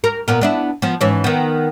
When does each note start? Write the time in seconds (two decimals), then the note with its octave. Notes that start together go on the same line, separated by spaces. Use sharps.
0.04 A#4
0.28 A#2 B3 A#4
0.41 B3 D4 E4
0.82 F3 B3
1.01 G#2 E3 C#4
1.24 D#3 B3